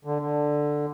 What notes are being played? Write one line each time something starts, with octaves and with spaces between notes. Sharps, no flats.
D3
D3